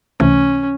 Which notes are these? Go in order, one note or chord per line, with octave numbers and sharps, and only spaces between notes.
C#2 C3 E3 A3 C#4